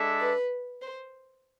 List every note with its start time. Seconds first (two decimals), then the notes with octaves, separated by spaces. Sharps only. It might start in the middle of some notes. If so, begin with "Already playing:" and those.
Already playing: G#3 D4 A4 E5
0.21 B4
0.82 C5